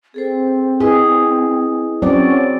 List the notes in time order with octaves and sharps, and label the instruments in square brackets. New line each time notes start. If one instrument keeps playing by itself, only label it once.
[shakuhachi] C4 [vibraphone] G#4 A4 C5
[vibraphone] E4 B4 D#5 [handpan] G#4
[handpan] F#3 C4 D5 [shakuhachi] C#4